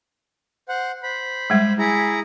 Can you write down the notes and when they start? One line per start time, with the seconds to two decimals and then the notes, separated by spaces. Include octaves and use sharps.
0.69 C5 F#5
1.03 C5 B5
1.50 G3 G#3 E5
1.79 E4 G#4 A#5